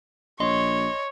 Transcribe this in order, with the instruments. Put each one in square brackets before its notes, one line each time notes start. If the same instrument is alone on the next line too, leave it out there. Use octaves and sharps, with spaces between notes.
[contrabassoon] A#1 [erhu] C#5 [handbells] D#5 C6